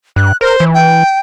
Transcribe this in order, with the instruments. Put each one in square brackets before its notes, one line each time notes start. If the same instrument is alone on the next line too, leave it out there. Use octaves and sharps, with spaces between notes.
[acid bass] G2 [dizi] F#6
[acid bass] A#4 [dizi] C5
[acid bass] E3
[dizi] G5